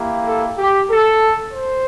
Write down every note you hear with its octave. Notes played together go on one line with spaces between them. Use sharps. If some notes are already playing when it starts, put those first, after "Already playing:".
Already playing: A#3 E4 G4
A4
G4
A4
C5